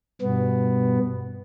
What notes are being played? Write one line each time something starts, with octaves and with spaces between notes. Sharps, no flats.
G2 B2 B3